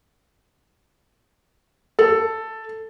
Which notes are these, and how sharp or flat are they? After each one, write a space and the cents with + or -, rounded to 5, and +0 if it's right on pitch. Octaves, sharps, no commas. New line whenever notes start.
A4 +5